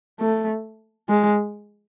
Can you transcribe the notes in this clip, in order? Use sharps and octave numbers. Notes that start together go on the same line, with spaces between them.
A3
G#3